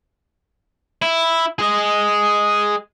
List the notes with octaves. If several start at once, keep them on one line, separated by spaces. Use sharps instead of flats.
E4
G#4 D#5